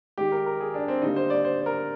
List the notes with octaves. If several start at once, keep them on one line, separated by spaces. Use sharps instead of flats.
D#3 G#3 G4
A#4
A#4
G#4
D4
C4
D3 G3 A#3 D#4
C5
D5
C5
C5
A#4